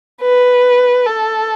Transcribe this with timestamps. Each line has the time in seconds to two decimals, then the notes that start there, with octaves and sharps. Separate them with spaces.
0.22 B4
1.06 A4